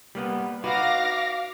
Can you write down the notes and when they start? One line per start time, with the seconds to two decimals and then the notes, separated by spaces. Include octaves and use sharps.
0.15 G3 A#3 B3
0.64 D#4 F#4 B4 F5 D6 A#6